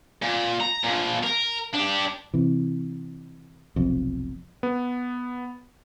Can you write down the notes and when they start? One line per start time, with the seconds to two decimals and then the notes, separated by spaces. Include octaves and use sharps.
0.22 A#2
0.61 A#5
0.84 A#2 F3
1.23 A#4
1.74 D4 G4
2.34 C3 E3
3.76 F1 B1 F2
4.63 B3